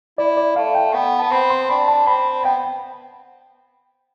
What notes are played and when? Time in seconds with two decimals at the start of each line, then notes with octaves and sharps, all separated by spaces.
0.18 E4 D5
0.37 D5
0.56 A3 F5
0.75 G5
0.94 B3 G5
1.20 B3 A5
1.31 C4 B5
1.50 C6
1.69 D4 B5
1.88 A5
2.07 C4 B5
2.44 B3 G5